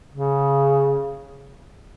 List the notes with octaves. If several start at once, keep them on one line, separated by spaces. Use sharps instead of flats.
C#3